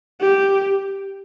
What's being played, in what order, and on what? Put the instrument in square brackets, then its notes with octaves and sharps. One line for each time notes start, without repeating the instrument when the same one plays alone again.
[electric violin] G4